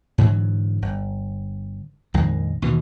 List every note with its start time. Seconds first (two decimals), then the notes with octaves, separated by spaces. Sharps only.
0.18 G#2 D3 E3 F#3
0.82 G1
2.14 A#1 F2 D#3 G#3
2.62 D#2 B2 E3